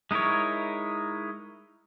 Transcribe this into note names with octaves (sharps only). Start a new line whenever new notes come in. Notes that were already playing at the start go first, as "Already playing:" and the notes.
G#3 D#4 E4 A#4 C#5